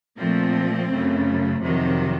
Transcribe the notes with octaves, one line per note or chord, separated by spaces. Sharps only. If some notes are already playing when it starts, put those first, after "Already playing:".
A#2 F3 A3 C4
F#2 C#3 A3
F2 C3 D#3 F#3